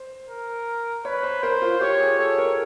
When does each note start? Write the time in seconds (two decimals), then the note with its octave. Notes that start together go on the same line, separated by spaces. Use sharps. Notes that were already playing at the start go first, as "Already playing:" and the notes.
Already playing: C5
0.29 A#4
1.05 B4 C#5
1.23 C5
1.42 A#4 C5
1.62 F4
1.81 G4 C#5
2.00 G#4
2.18 A4 C#5
2.38 A#4